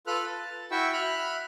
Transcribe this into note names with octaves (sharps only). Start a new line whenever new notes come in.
F4 A4 B4 B5 F6 F#6
A5
E4 F#4 E5 G5 C#6 E6
E5 B5 F6 F#6